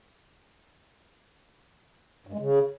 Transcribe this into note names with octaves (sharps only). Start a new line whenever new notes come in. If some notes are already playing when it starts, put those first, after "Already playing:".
G2
G#3
C#3